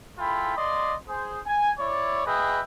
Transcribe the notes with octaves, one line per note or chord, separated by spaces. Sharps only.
G#3 E4 F4 A4 G5 B5
A#3 D5 D#5 C6
G#4 C5
G#5
E4 C#5 D5
F#4 G#4 B4 D#5 E5 G5